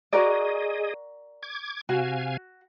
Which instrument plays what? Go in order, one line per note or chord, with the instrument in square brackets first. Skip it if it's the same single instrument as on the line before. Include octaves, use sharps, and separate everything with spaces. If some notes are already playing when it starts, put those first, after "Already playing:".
[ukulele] F#4 A#4 D5 [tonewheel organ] G#4 D#5
[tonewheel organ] D6 G#6
[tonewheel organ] C3 F5 G#5 [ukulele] F#4